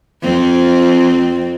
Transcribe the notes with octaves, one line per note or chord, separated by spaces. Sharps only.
F2 C4